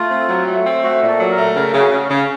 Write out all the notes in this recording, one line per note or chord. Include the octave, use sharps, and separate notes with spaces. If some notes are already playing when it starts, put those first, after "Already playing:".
Already playing: A3 F4
C4
F#3
A3
C4
A3 F#4
A#2
A4
F#3
A#4
A3
C#3 A#4
C#3
F#4
C#3
C#3